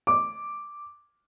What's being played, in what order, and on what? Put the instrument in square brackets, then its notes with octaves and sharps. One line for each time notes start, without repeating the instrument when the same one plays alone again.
[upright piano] D6